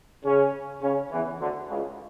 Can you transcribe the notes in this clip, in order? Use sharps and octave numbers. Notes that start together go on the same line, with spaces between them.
C#3 C#4
C#3 C#4
E2 E3
D2 D3
C#2 C#3